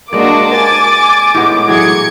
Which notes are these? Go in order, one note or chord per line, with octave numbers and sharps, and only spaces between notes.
G#3 A#3 D4 F#4 D5 D6
G#5 A6
A2 G#3 B3
E3 F#3 G#4 G#6 C#7